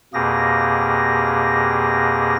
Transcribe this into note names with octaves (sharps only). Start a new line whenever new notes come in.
F2 B2 A#3 G4 G#4 A#6